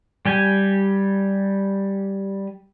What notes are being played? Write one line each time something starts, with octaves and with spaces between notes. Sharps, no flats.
G3 G4 G#5